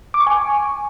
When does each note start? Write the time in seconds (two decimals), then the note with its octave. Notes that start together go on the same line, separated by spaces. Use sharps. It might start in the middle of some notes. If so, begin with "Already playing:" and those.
0.14 D6
0.20 C#6
0.27 G#5